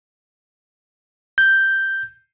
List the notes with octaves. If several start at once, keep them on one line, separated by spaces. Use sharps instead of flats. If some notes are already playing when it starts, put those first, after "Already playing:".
G6